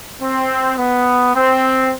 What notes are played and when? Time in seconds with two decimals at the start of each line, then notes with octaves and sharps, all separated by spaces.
0.22 C4
0.78 B3
1.35 C4